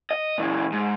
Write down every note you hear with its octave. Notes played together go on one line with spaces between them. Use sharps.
D#5
A#2 E3
G#2